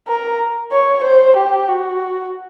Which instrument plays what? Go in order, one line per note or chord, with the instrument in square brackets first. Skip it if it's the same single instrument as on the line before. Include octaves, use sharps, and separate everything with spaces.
[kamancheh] A#4
C#5
C5
G4
F#4